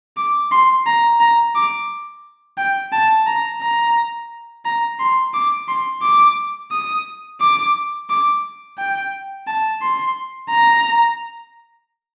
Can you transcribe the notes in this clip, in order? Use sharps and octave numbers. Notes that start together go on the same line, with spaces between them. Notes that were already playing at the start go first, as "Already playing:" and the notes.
D6
C6
A#5
A#5
D6
G5
A5
A#5
A#5
A#5
C6
D6
C6
D6
D#6
D6
D6
G5
A5
C6
A#5